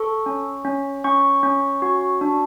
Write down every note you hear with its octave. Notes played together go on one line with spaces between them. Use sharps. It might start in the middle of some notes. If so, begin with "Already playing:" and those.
Already playing: A4 C#6
C#4
C#4
C#4 C#6
C#4
F#4
D4